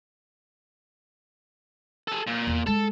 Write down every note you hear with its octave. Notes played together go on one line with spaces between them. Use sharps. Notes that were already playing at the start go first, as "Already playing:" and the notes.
G#4 A4
A#2
E2
G#3 A4